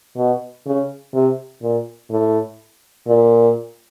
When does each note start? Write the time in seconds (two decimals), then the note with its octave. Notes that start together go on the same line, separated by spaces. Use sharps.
0.17 B2
0.66 C#3
1.14 C3
1.62 A#2
2.10 A2
3.07 A#2